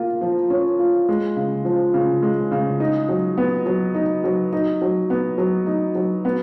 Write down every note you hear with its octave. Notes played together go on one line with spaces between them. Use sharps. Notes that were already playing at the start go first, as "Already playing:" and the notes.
Already playing: A#3 F4
F3
C#4
F4
G#3
C#3
F3
C#3
G#3
C#3
D#4
F#3
B3
F#3
D#4
F#3
D#4
F#3
B3
F#3
D#4
F#3
B3